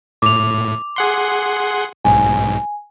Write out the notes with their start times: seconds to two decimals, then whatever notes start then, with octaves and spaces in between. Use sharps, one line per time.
0.22 A2 D6 F7
0.96 G#4 F#5 C6
2.05 B1 G#2 G#5